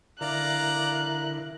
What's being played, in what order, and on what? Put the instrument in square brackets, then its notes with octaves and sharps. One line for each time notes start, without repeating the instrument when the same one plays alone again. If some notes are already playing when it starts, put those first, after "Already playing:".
[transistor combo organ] D3 E4 A#4 [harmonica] D5 F5 A#5 [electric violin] F#6